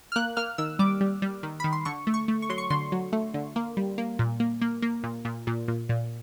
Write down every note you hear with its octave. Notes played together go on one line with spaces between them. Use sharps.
F6
A#3 F#6
A#3 F6
D#3 E6
G3 D6
G3
G3
D#3
D#3 B5
C6
D3 C#6
A3
C#6
A3
C#6
F#3 C6
C#6
D3 C6
F#3
A3
D3
A#3
G3
A#3
A#2
A#3
A#3
A#3
A#2
A#2
A#2
A#2
A#2